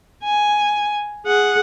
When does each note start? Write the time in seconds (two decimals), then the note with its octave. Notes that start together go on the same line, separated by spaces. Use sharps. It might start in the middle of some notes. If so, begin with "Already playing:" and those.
0.24 G#5
1.26 G#4 F#5